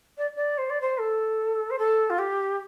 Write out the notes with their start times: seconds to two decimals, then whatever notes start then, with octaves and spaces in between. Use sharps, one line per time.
0.18 D5
0.36 D5
0.58 C5
0.70 D5
0.81 C5
0.98 A4
1.70 C5
1.79 A4
2.10 F4
2.18 G4